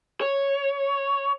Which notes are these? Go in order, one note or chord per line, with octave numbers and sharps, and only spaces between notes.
C#5